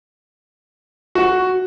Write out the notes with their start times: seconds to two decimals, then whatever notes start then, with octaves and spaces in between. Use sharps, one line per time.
1.15 F#4